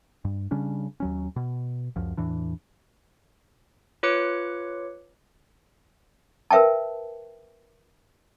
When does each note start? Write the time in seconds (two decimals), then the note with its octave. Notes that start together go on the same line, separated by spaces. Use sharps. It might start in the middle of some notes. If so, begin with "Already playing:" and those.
0.25 G2
0.51 C#3 G3 C#4 D4
1.00 D#2 F#3 C#4
1.36 B2
1.96 C#2 F#2 F3
2.17 E2 A2 E3 D4
4.03 F4 B4 C#5 D6 F#6 C#7
6.51 A#4 B4 E5 G5 A5